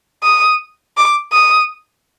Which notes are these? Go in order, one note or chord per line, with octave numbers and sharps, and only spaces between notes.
D#6
D6
D#6